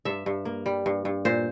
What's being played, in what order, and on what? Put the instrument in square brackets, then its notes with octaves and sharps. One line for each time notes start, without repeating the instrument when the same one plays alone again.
[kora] G2 E5
G2
A#3
G3
G2
G2
A#2 C5